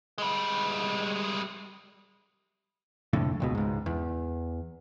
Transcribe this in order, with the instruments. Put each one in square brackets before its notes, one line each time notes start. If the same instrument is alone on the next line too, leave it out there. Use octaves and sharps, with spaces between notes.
[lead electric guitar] G3 G#3
[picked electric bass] C2 F2 A2 D3
E1 C#2 B2
C#2 G#2
E2